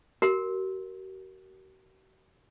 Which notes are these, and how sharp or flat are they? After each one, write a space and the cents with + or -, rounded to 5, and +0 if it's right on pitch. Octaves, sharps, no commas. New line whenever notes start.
F#4 +45 A#4 +0